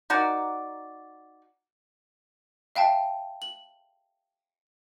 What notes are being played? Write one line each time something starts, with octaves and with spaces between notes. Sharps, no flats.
D#4 F#4 A#4 D5
E5 F5 G5 A5
F#7